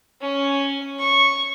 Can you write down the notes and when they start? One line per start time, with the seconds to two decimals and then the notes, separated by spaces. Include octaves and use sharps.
0.21 C#4
0.99 C#6